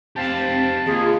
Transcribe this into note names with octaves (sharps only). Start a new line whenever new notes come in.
C4 G4 F5 A5
D#2 F4 G#4